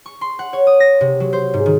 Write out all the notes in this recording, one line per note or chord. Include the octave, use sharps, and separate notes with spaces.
C#6
C6
F#5
C#5
D#6
A#6
C3
F#3
C5
G#2
D#3